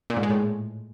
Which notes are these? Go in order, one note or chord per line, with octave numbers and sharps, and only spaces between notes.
A#2
G#2
G#3
A2